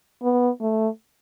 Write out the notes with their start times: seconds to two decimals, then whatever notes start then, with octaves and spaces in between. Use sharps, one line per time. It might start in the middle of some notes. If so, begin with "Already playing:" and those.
0.22 B3
0.61 A3